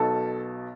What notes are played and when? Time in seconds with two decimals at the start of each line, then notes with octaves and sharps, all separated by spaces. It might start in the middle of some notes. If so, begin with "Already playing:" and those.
Already playing: B1 B2 A4